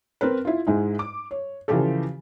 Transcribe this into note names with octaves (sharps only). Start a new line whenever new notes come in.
C4 A#4 B4
E4 F4
G#2 G#3 E4
D6
C#5
C#3 E3 F3 F4 G4 A4